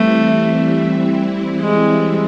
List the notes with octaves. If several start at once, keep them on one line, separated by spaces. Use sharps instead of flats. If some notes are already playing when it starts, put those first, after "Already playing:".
Already playing: E3 G3 A3 C4 E4
G#3